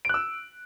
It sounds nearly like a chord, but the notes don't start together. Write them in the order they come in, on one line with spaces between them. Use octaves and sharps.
D7 F#6 E6